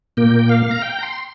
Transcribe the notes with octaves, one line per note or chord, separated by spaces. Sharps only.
A#2 A#3 G5
G5
F5
A#5
G5
A#5
C6